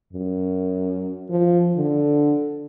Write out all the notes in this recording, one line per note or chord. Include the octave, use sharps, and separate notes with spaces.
F#2
F3
D3